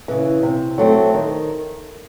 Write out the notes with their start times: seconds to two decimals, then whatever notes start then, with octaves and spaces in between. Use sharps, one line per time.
0.08 C#3 E3
0.43 C3
0.78 F#3 A3 C4
1.14 D#3